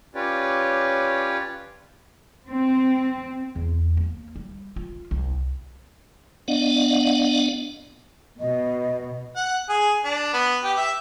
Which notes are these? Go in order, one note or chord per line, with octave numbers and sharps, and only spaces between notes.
C#4 F4 G4 B4 C#5 D5
C4
E2
A#3
G3
F4
C2
B3 D4 D5 D#5 F5 F#5
B2 D#5
F#5
G#4
D4
B3
G4
E5